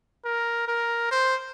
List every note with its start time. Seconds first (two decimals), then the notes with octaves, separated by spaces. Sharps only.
0.25 A#4
0.68 A#4
1.11 C5